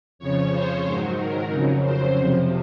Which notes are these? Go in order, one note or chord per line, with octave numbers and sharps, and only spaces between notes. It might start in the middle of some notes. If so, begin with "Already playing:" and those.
F2 C#3 F3 C#5
C5
G#2 D#3 F#3 C5
A#4
F2 C#3 F#3
C5
F2 C3 F3